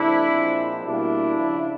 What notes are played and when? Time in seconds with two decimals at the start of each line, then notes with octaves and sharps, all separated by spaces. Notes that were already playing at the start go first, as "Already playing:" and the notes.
Already playing: C2 C3 E3 A3 C4 D4 E4
0.30 A#2 F3 G#3 C4
0.84 B2 G3 A#3 D4 E4
1.39 C#2 C#3 F3